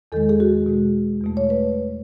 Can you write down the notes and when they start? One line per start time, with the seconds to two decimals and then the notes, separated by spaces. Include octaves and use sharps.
0.12 E2 D#3 G#3 A4
0.29 G#4
0.40 F#4
0.66 B2 G#3
1.21 E2 B2 A3
1.37 C#5
1.50 B4